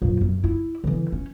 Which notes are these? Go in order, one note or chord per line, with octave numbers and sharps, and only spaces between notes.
A#1 F#2
F#2
E4
D3 E3
C#4